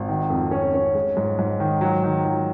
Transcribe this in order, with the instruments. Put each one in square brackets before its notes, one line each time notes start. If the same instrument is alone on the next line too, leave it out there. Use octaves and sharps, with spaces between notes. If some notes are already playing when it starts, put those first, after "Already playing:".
Already playing: [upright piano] G#1
D#3
F2
C#4
C#4
G#3
G#2
G#2
D#3
F#3
D#3
F#3